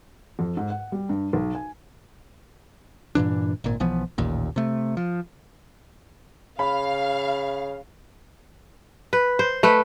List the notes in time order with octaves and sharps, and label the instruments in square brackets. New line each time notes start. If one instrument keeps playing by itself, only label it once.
[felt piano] F2
G#2
F#5
G3
G2
B1
G#5
[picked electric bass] G2 A#2 E3 D4
G#1 A#2
B1 E3 F3 B3
A1 D#2 A#2
C3 A3
F3
[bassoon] C#3 [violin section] F5 [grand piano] B5
[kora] B4
C5
A3 B4